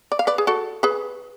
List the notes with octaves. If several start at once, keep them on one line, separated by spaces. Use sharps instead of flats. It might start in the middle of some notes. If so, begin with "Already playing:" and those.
D5
F5
B4 D5
G#4
F#4 A4
G#4 B4